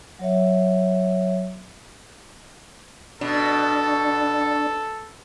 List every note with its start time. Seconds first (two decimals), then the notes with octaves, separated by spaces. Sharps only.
0.19 F#3 C#5 E5
3.21 B2 D4 A4